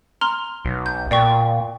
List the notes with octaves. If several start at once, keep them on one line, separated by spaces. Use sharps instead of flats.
A#5 C6 F6
B1
G6
A#2 D5 G5 C#6